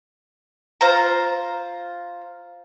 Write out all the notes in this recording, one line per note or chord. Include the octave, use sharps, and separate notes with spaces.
F4 C5 A#5